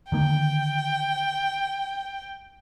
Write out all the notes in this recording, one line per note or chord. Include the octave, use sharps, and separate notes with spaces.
D3 D#3 A#3 G5